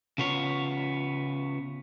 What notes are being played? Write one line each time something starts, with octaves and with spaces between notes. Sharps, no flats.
C#3 B3 F4 C#5